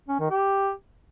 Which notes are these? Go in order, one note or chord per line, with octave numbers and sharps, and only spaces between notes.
C#4
D#3
G4